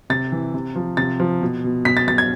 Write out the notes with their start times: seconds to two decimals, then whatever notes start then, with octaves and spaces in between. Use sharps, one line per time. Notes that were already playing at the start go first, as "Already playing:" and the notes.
0.10 C3 A6
0.32 E3
0.54 C3
0.75 F3
0.97 C3 A6
1.20 F3
1.41 B2
1.64 B2
1.85 B2 B6
1.97 A6
2.07 B2 A6
2.18 G#6